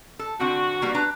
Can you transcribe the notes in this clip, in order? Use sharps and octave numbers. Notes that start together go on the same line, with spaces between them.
A4
D3 C4 F#4
G3 A#3 B3
D4 B4 A#5